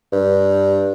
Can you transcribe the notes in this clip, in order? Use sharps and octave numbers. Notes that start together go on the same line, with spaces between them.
G2